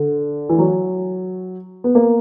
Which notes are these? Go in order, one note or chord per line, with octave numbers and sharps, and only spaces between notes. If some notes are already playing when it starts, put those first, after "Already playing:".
Already playing: D3
E3
F#3
B3
A#3